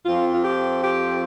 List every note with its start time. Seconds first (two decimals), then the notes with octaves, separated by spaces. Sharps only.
0.05 F2 F3 C4 F4
0.33 F4
0.45 G4
0.84 G4